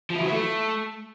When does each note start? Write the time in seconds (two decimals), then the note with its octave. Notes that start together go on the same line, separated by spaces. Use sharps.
0.10 F3
0.15 E4
0.21 F#3
0.26 E4
0.32 A3